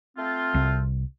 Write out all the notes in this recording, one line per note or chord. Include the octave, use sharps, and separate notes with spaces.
A3 C4 F4
C2